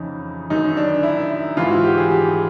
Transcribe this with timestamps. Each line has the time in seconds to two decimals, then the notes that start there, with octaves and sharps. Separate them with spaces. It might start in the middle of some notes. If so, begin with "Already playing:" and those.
Already playing: F2 C#3 E3 D#4
0.50 F#2 D#3 D#4
0.77 D4
1.03 E4
1.57 G#2 E3 F4
1.70 F#4
1.83 G4
1.97 G#4
2.10 G4